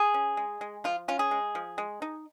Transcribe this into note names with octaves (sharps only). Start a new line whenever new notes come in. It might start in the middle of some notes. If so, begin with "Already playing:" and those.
Already playing: G#4
C#4
G#3
G#3
F3 F4
C#4 F4
G#4
G#3
F3
G#3
D#4